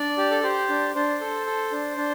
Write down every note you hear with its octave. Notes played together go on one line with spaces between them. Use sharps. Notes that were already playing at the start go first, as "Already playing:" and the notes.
Already playing: D4 D5
G4
A4
G4 C5
D4
D4 C5
A4
A4
D4
D4